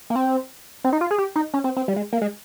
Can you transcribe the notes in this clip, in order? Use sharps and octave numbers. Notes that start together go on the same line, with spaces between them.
A#3
C4
C4
D#4
F4
G#4
G4
D#4
C#4
C4
C4
G3
G#3
A#3
G#3